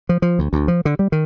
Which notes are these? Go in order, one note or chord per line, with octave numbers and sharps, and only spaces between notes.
F3
F3
D2
D2
F3
D3
G3
D#3